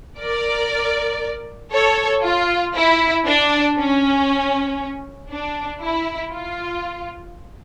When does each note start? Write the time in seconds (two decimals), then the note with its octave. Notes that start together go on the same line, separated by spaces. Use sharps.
0.19 A#4 D5
1.72 A4 C#5
2.23 F4
2.75 E4
3.26 D4
3.77 C#4
5.30 D4
5.81 E4
6.32 F4